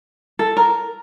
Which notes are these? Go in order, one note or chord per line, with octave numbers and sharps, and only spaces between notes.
A4
A#4